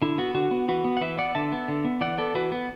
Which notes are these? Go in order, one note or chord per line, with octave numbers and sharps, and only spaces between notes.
D3 E4
B3 F#4
D3 F#4
B3
E3 F#4 B4
B3
F#5
E3 B4 E5
B3 D5 F#5
D3 E5 A5
B3
D3
B3
E3 D5 F#5
B3 A4 D5
E3 F#4 B4
B3